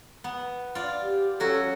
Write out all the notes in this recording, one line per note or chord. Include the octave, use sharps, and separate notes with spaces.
B3
F4 D5
G4
F#3 C#4 F#4 A4